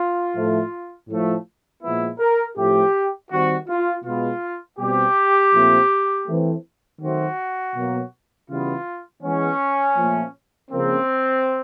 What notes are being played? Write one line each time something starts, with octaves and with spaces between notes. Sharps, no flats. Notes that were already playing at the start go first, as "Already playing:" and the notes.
Already playing: F4
A2 F3 A3
A2 F3 A3
A#2 F3 G#3 B3 E4
A#4
A2 F3 A3 C4 G4
D#3 G3 C4 F#4
F4
B2 G#3 B3 F4
B2 G3 C4 G4
A#2 F3 A3 C4
E3 A3 C4
D#3 F#3 A3 C4 F#4
B2 F#3 A#3
C#3 E3 G3 B3 F4
E3 G#3 B3 C#4
A#2 F3 A3
C#3 F3 A#3 C4